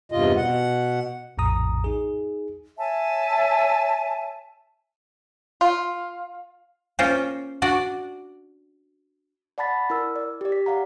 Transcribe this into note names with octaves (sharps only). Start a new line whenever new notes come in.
E2 G2 C3 F4 D#5
B2 F#5
A#1 F2 A2 A#5 D#6
D#4 G#4
C#5 E5 G#5 A5
F4
A#3 C#4 F4 A#4 C5 C#5
D4 F#4 D5 F#5
D5 F#5 A5 B5 A6 B6
E4 A#4 E6
D5
G4 D5
B6
D5 F5 F#5 A#5